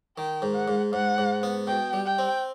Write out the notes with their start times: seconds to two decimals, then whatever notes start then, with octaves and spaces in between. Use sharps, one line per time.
0.17 D#3 G5
0.42 G#2
0.55 F#5
0.68 G#2
0.93 G#2 F#5
1.18 G#2
1.43 B3
1.67 B2 G5
1.93 G3
2.06 G5
2.18 C4